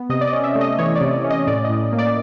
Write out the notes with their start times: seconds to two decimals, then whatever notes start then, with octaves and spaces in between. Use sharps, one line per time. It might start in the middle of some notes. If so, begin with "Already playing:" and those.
Already playing: B3
0.09 C3 D#5
0.21 D5
0.27 D#5
0.33 C#4
0.44 E5
0.55 A3
0.61 D#5
0.79 E3 C#5
0.95 D5
1.01 C3
1.13 D5
1.24 C#4
1.30 D#5
1.47 A2 D5
1.65 A2 D#5
1.92 A#3
1.99 D5